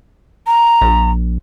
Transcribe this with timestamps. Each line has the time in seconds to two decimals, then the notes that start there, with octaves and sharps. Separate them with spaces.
0.47 A#5
0.82 A#1